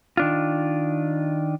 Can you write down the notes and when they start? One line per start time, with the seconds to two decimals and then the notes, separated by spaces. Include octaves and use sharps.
0.17 D#3 D4 F4